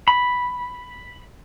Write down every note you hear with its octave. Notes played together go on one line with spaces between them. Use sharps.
B5